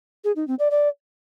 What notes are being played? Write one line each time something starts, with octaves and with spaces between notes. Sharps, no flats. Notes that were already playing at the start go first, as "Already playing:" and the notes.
G#4
D#4
C4
D5
D5